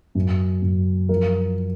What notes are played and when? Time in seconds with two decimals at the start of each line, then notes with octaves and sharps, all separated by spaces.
0.15 F#2
0.62 F#2
1.09 F3 A#4